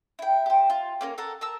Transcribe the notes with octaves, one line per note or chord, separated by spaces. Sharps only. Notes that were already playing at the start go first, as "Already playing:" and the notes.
E4 G5
G4 C5
F4
A#3 C#4 A#4
A4 A#4 F#5 A5
A#4 A5 E6